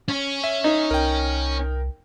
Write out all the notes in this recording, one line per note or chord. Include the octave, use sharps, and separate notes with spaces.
C#4
E5
D#4
C2 A#4 G5